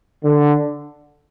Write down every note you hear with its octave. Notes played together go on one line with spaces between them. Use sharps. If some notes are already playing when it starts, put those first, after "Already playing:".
D3